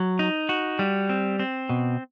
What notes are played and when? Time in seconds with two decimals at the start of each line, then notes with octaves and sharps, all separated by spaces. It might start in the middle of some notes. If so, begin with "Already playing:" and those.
Already playing: F#3
0.19 D#4
0.49 F#4
0.79 G3
1.09 C4
1.40 C4
1.69 B2